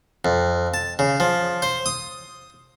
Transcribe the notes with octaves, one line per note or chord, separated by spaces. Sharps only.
F2
A5
C#3
F3
C5
D#6